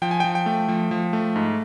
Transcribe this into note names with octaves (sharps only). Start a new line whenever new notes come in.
F3 G5
G#5
F3 G5
G5
A3
F3
F3
A3
G#2